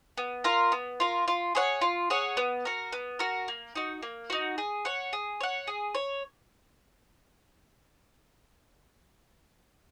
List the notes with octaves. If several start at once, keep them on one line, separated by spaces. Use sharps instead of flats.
B3
F4 A#4
B3
F4 A#4
F4
G#4 C#5 F#5
F4
G#4 C#5 F#5
B3
F#4 A#4
B3
F#4 A#4
A#3
D#4 F#4
A#3
D#4 F#4
G#4
C#5 F#5
G#4
C#5 F#5
G#4
C#5